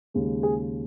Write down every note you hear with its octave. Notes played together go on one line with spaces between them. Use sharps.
D#2 C#3 G#3
G#4